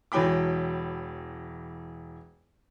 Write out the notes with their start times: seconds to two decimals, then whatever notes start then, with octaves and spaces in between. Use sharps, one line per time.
0.12 E1 E3 F#3 G5 B5 D6